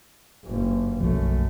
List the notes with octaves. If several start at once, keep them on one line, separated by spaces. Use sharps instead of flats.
F#1 G2
B1 F#2 F3 A3